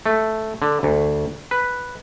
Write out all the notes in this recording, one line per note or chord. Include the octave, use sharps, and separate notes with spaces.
A3
D3
D2
B4